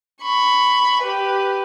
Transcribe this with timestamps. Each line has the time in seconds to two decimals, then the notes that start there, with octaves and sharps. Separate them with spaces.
0.21 B5 C#6
1.02 G4 B4